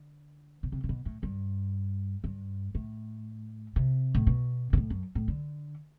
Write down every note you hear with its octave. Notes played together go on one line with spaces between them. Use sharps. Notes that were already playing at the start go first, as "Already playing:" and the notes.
Already playing: D3
B2
C3
C3
B2
A2
G2
G2
A2
C3
A2
B2
B2
A2
F#2
A2
D3